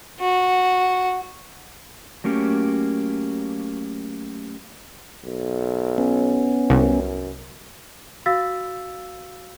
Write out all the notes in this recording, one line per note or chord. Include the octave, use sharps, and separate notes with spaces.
F#4
F#3 A3 A#3 C#4 G4
B1
B3 C#4
C2 F#2
F#4 F5 E6 A6 B6